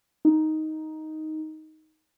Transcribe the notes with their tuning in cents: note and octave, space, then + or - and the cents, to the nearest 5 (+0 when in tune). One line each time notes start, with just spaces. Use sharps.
D#4 +5